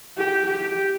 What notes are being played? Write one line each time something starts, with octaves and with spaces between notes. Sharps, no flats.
G4
G4